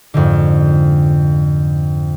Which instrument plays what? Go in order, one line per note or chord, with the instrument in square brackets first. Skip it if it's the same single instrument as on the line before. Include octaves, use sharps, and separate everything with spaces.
[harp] F2 G#2 D3